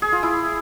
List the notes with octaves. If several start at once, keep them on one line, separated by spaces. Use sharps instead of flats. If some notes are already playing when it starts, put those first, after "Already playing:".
G#4
F4
E4